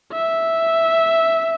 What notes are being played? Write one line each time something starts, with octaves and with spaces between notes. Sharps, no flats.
E5